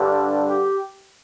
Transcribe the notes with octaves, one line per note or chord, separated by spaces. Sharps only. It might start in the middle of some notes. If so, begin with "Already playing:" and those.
Already playing: G2 D3 G3
G4